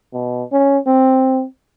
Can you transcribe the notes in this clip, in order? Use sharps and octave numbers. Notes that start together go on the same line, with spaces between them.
B2
C#4
C4